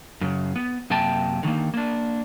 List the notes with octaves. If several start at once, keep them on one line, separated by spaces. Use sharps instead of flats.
F#2 C#3
B3
F#2 C3 A#3 G5 A5
D3 D#3 G#3 A#3
A#3 D4